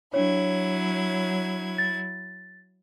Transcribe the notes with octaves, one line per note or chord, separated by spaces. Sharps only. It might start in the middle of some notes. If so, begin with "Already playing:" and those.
F#3 D4 E4 C#5 G#6
A6